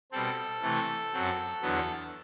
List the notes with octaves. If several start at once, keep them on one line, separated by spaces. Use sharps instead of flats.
B2 G3 C4 A4
C3 E3 A3
F#2 F#3 C4
E2 D3 F#3 B3